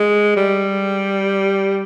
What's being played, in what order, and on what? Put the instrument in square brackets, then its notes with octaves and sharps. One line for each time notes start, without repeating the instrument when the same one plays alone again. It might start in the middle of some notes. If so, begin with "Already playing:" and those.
Already playing: [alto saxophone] G#3
G3